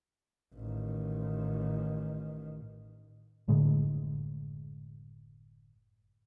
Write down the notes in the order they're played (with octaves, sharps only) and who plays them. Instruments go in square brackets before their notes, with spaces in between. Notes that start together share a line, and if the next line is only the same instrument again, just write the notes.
[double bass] A1 D#3
[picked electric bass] F#1 A2 D3 G#3